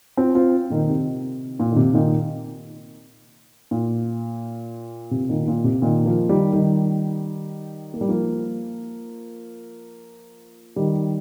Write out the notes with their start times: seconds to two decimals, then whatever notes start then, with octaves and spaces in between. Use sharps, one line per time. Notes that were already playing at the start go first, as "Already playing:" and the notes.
0.17 C4 F4
0.35 C4 F4
0.70 A#2 D#3
0.89 C3
1.60 A#2
1.72 D#3
1.76 C3
1.94 A#2 D#3
3.71 A#2
5.11 C3
5.29 A#2 D#3
5.48 A#2
5.64 C3
5.82 A#2 D#3
6.06 F3 A#3
6.29 D#3 G3
6.53 D#3 G3
7.94 A#3
8.01 G3
8.08 F3 A#3
10.76 D#3 G3